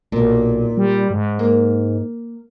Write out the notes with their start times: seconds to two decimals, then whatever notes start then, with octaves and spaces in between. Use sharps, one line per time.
0.12 B1 A#2
0.77 G3
1.10 G#2
1.39 A#3